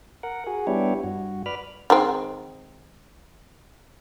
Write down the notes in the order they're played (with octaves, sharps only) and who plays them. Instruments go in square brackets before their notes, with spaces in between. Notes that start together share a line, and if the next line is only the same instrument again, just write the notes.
[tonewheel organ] A#4 F#5
F#4 G#4
G3 B3 D4 E4 G4 C#5
G2 F#4
B4 D5 B5 F6
[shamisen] D#3 G#3 C4